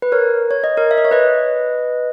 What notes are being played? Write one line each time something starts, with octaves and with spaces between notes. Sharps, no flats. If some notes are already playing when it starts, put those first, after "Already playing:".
B4
A#4 C#5
C#5
D#5
A#4 C#5
E5
D#5
C#5
B4 D#5